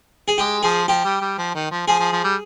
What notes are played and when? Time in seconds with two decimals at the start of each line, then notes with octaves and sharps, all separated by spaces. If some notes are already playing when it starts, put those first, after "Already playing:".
0.28 G#4
0.38 G#3 G4
0.63 F3 G#4
0.88 F3 G4
1.04 G3
1.21 G3
1.38 F3
1.55 D#3
1.71 F3
1.87 F3 G#4
1.99 F3
2.12 F3
2.24 G3